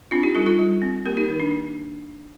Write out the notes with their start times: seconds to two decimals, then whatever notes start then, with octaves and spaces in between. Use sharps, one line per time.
0.11 C4 D4 F4
0.23 D#4 G4
0.35 G3 F4 A4
0.46 F4 A4
0.59 G3
0.82 C4
1.06 A#3 G4 A#4
1.17 D#4 G4
1.28 D#3
1.40 D4
1.51 D4